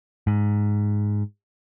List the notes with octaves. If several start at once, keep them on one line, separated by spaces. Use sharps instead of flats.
G#2